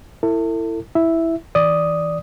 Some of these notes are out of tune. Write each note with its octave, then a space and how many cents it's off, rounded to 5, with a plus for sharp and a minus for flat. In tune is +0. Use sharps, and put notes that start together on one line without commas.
E4 +10 A4 +40
E4 +0 E5 +0
E3 -20 D5 +0 D#6 +0